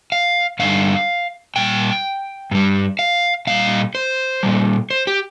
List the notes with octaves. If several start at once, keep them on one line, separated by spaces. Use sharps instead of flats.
F5
G2 D3 G3 F5
A#2 G3 G5
G2 G3
F5
A#2 G3 F5
C5
A#2 G3
C5
G4